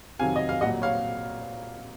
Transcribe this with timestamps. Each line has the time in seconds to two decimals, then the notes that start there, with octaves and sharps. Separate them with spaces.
0.20 F2 C3 D#3 F#3 F5 G#5
0.36 D#5
0.49 F5
0.61 C2 A#2 F#3 D#5 F#5
0.82 C#5 F5